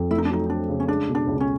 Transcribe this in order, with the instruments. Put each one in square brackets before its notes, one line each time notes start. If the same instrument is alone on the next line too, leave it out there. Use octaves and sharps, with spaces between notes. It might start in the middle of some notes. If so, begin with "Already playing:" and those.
Already playing: [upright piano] F2
[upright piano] A3 [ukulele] E4
[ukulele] D#4
D4
[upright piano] F#3 [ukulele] D#4
[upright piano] C4 [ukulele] D4
[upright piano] C#3
[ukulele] C#4
[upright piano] G#3 [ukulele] D4
[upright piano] B2
[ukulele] D4
[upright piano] C#2
[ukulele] C#4